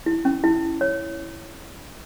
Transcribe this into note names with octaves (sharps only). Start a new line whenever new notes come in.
E4
C#4
E4
C#5